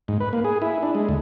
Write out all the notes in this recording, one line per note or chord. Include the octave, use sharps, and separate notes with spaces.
G#2
B4
A#3
G#4
E4
D4
G#3
D2